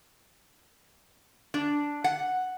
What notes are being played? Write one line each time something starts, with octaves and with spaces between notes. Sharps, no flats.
D4
F#5